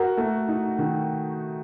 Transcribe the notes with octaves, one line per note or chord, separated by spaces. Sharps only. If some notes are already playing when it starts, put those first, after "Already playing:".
Already playing: F#4 A#4
A3
D#4
D#3